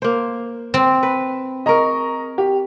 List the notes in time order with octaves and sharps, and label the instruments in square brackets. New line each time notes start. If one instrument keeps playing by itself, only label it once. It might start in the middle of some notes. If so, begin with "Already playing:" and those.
[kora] A#3 C5
[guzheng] C4
[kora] B4
[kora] G#4 A#4 [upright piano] D#5 A#5 C#6
[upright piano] G4